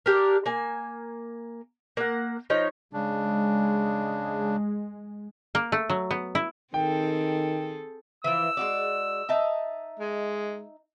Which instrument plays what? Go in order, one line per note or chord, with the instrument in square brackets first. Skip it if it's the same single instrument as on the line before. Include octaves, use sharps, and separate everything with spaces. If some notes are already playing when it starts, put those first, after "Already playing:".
[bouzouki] D4 G4 A#4
A#3 G#5
A#3 F#5
F3 D#4 C#5
[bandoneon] C#3 D4 [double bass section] G#3
[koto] A#3
A3
F#3
B3
E4
[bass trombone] D#3 [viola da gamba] C4 G#4 A4 [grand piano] G5
[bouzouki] E3 F3 [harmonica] E6
[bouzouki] G#3 F#4 D5
D#4 E5 A5
[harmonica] G#3